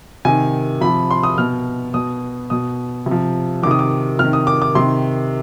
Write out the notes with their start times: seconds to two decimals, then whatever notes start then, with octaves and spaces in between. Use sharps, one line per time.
0.25 C3 D#3 G#5
0.81 C3 F3 B5
1.11 C6
1.23 D#6
1.38 B2 F6
1.94 B2 D#6
2.50 B2 D#6
3.06 C3 F3
3.63 D#3 D6
3.67 C3 D#6
3.79 D6
4.19 C3 D#3 F6
4.33 D#6
4.47 D6
4.62 D6
4.75 C3 D#3 C6